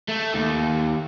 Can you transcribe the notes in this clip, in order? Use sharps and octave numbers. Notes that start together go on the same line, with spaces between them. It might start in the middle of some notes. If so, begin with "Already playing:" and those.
A3
D#2